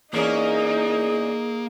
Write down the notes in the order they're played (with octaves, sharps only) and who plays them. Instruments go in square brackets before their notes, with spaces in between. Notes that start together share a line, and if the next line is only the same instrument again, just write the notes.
[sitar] E2 C#4 A#4 [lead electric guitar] A#3 [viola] D#4 [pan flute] G#4